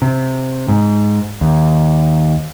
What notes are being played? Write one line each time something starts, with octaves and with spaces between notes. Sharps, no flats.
C3
G#2
D#2